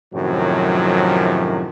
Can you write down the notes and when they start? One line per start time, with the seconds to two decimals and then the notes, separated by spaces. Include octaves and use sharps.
0.14 F#2 A2 C3 D#3 F3 F#3